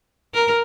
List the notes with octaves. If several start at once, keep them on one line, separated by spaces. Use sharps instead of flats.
A#4